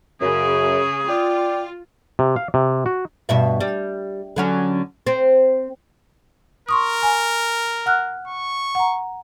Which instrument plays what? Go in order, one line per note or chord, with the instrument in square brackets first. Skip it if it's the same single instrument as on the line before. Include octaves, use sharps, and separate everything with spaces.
[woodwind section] F#2 [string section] C#3 [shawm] G#4
[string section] F4 [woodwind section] D5 G5
[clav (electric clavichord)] C3
F5
C3
F#4
[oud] G2 B2 E5
G3
D3 F#3 C#4
C4
[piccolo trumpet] A#4 [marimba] C6 C#6 D#6
[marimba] G#5
F#5 F6 F#6
[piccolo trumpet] C#6
[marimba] F#5 A#5